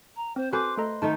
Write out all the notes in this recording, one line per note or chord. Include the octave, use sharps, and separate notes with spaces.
A#5
C4 C5
F#4 A4 B4 C5 G#5 D6
A3 A4 D#5 A#5
D#3 A3 D#4 A5